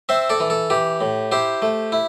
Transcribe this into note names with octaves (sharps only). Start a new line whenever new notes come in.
C4 C5 E5
A4 D5
E3
A4
E3 G4
A2
E4 G4 C5
A3
E4